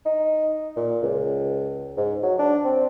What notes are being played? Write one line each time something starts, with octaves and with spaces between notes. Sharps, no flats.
D#4
A#2
C#2
G#2
F#3
D4
C4